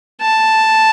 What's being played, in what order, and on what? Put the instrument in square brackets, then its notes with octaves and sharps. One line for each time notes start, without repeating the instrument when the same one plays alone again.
[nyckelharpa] A5